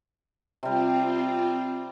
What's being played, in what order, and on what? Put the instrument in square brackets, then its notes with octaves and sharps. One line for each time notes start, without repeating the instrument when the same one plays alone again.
[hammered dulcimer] C3 G3 [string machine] C4 F4